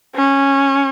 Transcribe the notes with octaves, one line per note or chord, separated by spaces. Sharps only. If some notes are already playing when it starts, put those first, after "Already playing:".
C#4